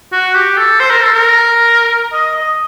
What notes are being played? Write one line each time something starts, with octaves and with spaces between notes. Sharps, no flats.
F#4
G4
A4
C5
A#4
A4
A#4
D#5
D#5